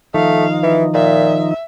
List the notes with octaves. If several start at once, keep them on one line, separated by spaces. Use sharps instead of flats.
D#3 F3 A3 D#4 F5
E3
A#2 E5